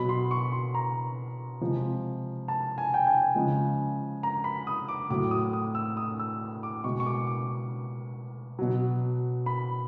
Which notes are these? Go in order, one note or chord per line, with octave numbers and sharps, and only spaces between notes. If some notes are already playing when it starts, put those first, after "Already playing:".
Already playing: B2 F#3 B5
C6
C#6
C6
A#5
C3 F3 G#3
A5
G#5
G5
G#5
C#3 F3 G#3
A#5
B5
D#6
D6
A2 F#3 D6
D#6
D#6
E6
D#6
E6
D6
B2 G#3 C#6
C#6
D6
D6
B2 F#3
B5